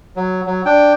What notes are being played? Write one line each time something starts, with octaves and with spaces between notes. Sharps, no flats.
F#3
F#3
D4 G5